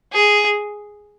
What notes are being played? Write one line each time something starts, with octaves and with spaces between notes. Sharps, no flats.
G#4